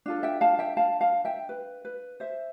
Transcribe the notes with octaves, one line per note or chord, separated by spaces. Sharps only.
D4 F4 A4
E5 G5
F5 A5
E5 G5
F5 A5
F5 A5
E5 G5
B4
B4
C5 E5